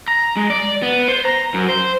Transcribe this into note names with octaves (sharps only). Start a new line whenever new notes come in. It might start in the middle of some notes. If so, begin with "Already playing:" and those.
A#5
G#3
D5
B3
C5
A#5
F#2
C5